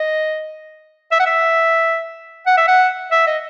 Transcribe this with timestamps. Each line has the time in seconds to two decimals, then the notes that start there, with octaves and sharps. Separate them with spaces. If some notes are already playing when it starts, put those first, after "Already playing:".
Already playing: D#5
1.12 E5
1.20 F#5
1.26 E5
2.46 F#5
2.57 E5
2.68 F#5
3.12 E5
3.27 D#5